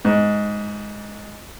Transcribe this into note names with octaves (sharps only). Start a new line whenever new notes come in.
G#2